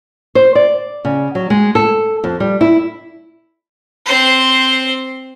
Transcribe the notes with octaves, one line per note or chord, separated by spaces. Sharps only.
C5
D5
C#3
F#3
G#3
A4
F2
G3
E4
C4 C5